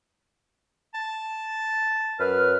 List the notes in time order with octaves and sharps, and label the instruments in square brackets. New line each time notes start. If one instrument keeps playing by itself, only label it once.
[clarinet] A5
[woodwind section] F#2 B4 F6